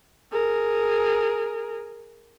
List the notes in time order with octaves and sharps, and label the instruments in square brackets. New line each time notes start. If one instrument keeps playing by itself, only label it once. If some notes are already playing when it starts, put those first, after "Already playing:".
[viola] G#4 A#4